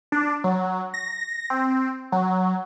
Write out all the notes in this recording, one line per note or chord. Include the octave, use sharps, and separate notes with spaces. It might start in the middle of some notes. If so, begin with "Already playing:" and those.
D4
F#3
A#6
C4
F#3